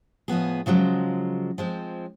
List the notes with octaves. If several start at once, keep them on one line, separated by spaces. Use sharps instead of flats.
A2 F3 B3 G#4
C#3 F3 F#3 G#3
F3 G#3 C4